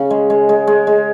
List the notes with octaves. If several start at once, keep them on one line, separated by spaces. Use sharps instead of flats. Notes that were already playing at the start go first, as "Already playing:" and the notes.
Already playing: C#3
G#3
G#3
G#3
G#3
G#3